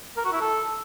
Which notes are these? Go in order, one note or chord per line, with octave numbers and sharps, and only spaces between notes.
A#4
F#4
E4
A4